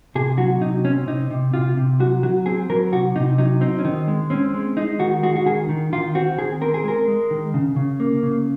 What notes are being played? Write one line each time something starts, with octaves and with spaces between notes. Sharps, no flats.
C3 G#4
F#3 F#4
C3 D#4
C4 C#4
C3 D#4
C3
C3 F4
C3
F#3 F#4
F#3 F#4
C4 G#4
F#3 A#4
C3 F#4
C3 D#4
F#3 D#4
C4 D#4
C#4
D#3 D#4
G#3
C4 C#4
G#3
G#3 D#4
D#3 F#4
G#3 F#4
F#4
D#3 G#4
D#3
D#3 F4
C4 F#4
D#3 G#4
C4 A#4
G#4
G#3 A#4
G#3
D#3
C#3
C#3
A#3
C#3